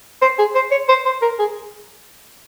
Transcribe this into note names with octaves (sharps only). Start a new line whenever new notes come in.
C5
G#4
C5
C#5
C5
C5
A#4
G#4